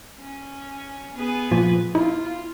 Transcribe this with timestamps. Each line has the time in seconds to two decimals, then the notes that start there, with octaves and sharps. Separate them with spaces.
0.20 C#4
1.16 B3 G#4 B4
1.51 A#2 F3
1.95 E4 F4